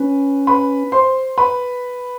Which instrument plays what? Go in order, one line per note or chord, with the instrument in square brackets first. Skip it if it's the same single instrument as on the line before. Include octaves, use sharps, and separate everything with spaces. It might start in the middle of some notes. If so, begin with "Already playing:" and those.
Already playing: [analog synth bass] C#4 [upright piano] B4
[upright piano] B4 B5
C5 C6
B4 B5